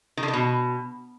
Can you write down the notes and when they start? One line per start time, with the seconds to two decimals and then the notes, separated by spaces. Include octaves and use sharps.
0.17 D#3
0.23 D3
0.28 D#3
0.33 B2